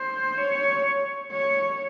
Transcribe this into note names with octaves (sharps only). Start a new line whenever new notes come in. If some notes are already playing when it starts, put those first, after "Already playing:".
Already playing: C5
C#5
C#5